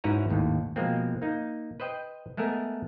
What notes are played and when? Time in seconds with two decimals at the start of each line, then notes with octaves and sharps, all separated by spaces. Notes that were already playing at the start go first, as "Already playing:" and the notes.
0.04 G#2 C#4 E4 F#4 B4 A#5
0.30 G#1 D#2 A2
0.76 B2 F3 G#3 A#3 C4
1.22 A#3 D#4
1.80 B4 C5 D#5 G5
2.37 G#3 A3 B3 A#4 G#5